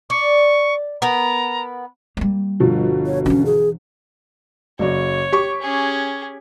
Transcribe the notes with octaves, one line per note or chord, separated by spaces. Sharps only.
D5 C#6
B3 A#4 B4 A#5
G3 A#3
G1 B2 F3
C#5
E3 C#4 D4
G#4
F#1 F#3 C#5 D5
G4 C#6
C#4 G#4